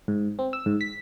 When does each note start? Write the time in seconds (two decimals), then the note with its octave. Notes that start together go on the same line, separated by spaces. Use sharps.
0.08 G#2
0.39 C4
0.53 E6
0.66 G#2
0.81 B6